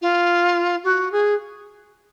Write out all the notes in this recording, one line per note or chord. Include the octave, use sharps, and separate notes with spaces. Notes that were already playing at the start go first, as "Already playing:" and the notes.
F4
F#4
G#4